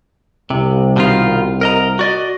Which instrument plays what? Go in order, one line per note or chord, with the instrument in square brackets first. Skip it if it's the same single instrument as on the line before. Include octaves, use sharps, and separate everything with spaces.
[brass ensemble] C2 [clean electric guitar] C3
[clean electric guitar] B2 D#3 F4
A#4 D#5 A#5
F#4 D5 D#5